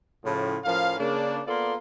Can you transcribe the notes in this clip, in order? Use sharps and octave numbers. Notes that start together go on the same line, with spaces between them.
A2 C#3 F3
A2 F3 C#4 A#4 F5
C#3 A#3 D4
A#3 B3 F4 A4 D5 C6